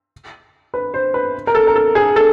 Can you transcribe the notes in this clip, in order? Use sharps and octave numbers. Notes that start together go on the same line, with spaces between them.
B4
C5
B4
A#4
A4
A#4
A4
G#4
A4